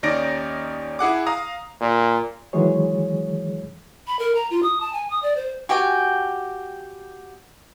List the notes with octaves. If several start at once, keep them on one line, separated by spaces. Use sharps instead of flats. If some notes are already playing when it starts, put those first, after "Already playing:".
D#2 C#4 D#4 D5 A#6 D7
E4 G#4 F#5 D6
F5 A#5 D#6
A#2
D#3 E3 F#3 G#3 G#4 C#5
B5
A#4
A#5
F4
D#6
A5
G#5
D#6
D5
C5
F#4 G4 G5 G#5